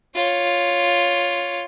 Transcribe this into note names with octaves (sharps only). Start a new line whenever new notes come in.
F4 C#5